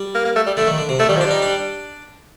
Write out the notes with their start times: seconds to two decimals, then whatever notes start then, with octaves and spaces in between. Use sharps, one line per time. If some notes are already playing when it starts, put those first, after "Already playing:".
Already playing: G3
0.15 A#3
0.25 A#3
0.36 A3
0.47 G3
0.57 D3 A3
0.67 D#3
0.78 D3
0.89 C3
0.99 D3 A3
1.09 D#3 G3
1.17 F3
1.21 D4
1.25 G3
1.31 D#4
1.42 D4